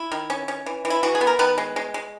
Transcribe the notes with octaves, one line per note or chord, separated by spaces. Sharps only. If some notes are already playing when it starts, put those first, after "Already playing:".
Already playing: E4
D#3
C#4
C#4
E3
E3
E4
E3 F#4
G#4
B3
A#4
D#3 B3 B4
G#3
G#3
G#3